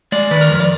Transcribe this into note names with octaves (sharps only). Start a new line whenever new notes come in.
G#3 D5
D#3 B4
A#4
F2
D5